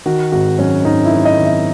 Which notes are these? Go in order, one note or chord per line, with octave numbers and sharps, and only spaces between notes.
D#3 F#4
G#1 F#4
F#2 C#4
G#1 D#4
E4
D#3
D#5
G#1
E5